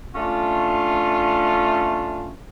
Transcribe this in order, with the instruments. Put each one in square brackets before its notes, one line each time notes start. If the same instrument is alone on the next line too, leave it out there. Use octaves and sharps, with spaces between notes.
[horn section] A3 C#4 D4 F4